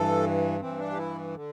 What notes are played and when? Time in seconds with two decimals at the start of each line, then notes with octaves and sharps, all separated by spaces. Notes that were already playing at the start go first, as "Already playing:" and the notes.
Already playing: G2 E3 A4
0.61 G2 E3 C4
0.79 D4
0.92 G4
0.97 E4
1.35 D3